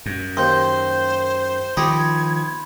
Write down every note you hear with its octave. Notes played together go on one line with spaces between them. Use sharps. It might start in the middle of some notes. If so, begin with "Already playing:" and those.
F#2
D#2 C5 C6 G6
D#3 F3 D#4 G4 B5 G#6